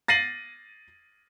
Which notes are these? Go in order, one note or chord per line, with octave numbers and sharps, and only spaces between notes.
A6 A#6 C7 D#7 F#7